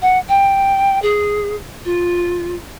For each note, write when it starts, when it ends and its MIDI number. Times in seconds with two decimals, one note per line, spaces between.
0.02 0.18 78
0.28 1.00 79
1.02 1.56 68
1.85 2.55 65